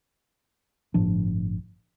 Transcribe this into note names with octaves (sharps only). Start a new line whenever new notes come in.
G1 A2 F3 D4